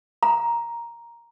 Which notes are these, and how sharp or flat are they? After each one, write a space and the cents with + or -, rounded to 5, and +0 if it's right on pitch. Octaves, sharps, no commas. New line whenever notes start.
A#5 +5